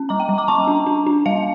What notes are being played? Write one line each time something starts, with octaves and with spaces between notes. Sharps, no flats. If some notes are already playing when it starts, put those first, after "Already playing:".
Already playing: C#4
G3 A#5 D6
G5 A#5
G3
A#5 D6
G3 A5 C#6
D4
D4
D4
G3 F5 A5